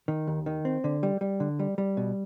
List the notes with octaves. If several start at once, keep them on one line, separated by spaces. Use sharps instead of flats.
D#3
D#2
D#3
C4
D3
G3
G3
D3
G3
G3
B2